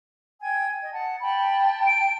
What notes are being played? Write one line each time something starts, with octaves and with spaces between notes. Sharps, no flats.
G5 G#5 G#6
D#5
F#5 A5
G5 A5 B5
D7